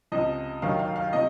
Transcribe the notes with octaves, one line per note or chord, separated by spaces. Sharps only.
C#2 C3 F3 D#5
F1 D#2 D#3 F#3 F5
F5
F5
C3 F3 D#5